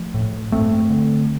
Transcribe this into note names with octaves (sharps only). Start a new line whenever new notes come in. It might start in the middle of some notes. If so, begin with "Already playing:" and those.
Already playing: F3 A3
A2
G2 A3 C4
D3